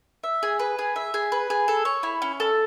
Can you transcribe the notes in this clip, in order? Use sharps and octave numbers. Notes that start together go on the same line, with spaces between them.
E5
G#4
B4
G#4
E5
G#4
B4
G#4
A4
C#5
E4
C#4
A4